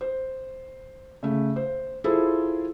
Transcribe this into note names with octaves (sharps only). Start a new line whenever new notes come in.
C5
C#3 A3
C5
E4 F4 G#4 A4 C5